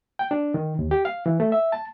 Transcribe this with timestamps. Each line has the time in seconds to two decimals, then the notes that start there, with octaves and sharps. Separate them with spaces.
0.19 G5
0.31 D4
0.54 D#3
0.79 D#2
0.91 G4
1.05 F5
1.26 E3
1.40 A3
1.52 E5
1.72 A5